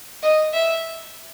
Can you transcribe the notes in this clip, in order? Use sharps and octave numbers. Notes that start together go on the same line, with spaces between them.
D#5
E5